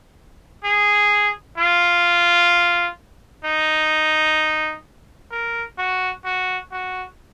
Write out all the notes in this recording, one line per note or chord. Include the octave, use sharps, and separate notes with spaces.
G#4
F4
D#4
A#4
F#4
F#4
F#4